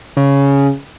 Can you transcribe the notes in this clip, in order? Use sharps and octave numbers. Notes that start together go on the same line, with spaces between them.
C#3